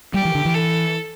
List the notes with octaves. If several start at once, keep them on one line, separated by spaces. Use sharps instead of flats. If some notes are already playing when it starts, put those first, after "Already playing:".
G3 G4
E3
D3
E3
A4